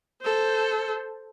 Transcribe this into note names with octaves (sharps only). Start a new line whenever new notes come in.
A4 C5